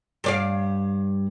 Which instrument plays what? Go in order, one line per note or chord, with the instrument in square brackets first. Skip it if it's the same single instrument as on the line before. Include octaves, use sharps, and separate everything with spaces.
[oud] G2 D5 F5